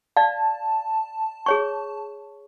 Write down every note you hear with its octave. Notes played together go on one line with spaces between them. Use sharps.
D5 F5 A5
G#4 C#5 C#6